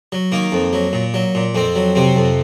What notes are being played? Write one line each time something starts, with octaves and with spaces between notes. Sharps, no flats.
F#3
D#3 A#3
F2
F#3
A#2
F#3
A#2
F2 C4
F#3
C3 C4
F2